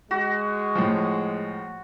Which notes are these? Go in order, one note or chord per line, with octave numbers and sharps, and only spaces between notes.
G#3 F#4
A2 F3